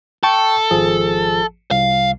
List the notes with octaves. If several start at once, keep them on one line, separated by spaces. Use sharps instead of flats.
A4 G5 A5 C#6
G#1 F3 G#4
C2 F5